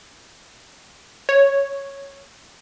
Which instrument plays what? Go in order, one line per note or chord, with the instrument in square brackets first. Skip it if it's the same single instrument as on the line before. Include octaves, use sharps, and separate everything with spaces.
[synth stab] C#5